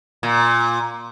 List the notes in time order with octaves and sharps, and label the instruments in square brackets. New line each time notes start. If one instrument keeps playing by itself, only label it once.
[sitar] A#2